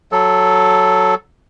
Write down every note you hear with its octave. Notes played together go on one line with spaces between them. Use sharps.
F#3 A4